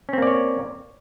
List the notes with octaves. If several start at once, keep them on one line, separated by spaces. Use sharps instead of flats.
A#3 C4 C#4 C#5 D5